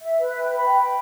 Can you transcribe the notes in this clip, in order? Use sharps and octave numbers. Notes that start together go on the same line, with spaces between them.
E5
B4
G5
B5
G5